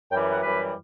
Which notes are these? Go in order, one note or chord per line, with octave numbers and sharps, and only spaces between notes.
F#2 E3 G3 G5
F#5
F#2 E3 G3 B4